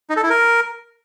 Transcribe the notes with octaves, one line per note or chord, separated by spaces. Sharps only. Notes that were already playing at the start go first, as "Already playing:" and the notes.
D#4
A4
E4
A#4